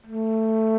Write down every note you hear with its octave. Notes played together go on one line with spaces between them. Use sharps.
A3